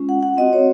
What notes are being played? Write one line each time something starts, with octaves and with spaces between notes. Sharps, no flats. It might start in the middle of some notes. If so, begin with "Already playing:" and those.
Already playing: G#3 C#4 F4
F#5
F#5
C4 F#4 D#5
C#5